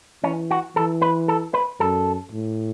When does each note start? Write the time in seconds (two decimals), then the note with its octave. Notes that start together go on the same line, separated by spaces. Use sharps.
0.24 E3 C#4
0.51 F#4
0.76 E3 A4
1.02 B4
1.28 A4
1.54 B4
1.80 F#2 A4
2.32 A2